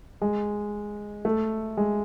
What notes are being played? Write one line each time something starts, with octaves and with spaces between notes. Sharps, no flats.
G#3
A3
G#3